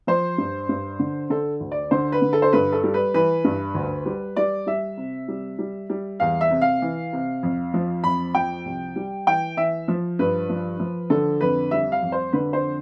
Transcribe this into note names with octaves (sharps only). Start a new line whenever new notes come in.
F3 C5
G2
G2
D3
D3 A4
D2
D5
D3 C5
B4
D3
A4
C5
G2 B4
A4
G3
B4
E3 B4
G2
D2
G3
G3 D5
G3 E5
C3
G3
G3
G3
E2 F5
E5
C3
F5
E3
C3
F2
F3
F2 B5
F3 G5
C2
G3
E3 G5
E3 E5
F3
G2 B4
F3
F3
D3 A4
F2 B4
G3 E5
F5
F2
C5
D3 B4
C5